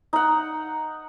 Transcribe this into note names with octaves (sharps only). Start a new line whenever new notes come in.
D#4 F#5